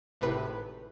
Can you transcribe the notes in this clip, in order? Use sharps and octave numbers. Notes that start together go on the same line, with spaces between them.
G#1 A2 C3 B4